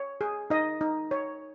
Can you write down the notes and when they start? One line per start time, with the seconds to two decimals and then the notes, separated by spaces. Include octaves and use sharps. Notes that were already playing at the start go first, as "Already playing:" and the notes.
Already playing: C#5
0.21 G#4
0.50 D#4 D#5
0.81 D#4
1.11 C#5